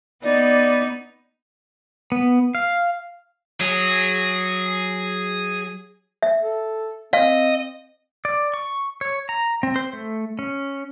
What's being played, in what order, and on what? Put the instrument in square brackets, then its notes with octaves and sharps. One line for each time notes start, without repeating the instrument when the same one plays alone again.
[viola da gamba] B3 D#4 [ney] D5
[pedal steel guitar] B3
F5
[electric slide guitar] F#3 [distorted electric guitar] G#4
[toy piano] E5
[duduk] A4
[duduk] C4 [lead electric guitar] D#5 [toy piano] F5
[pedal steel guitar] D5
C#6
C#5
A#5
C4
C5
A3
C#4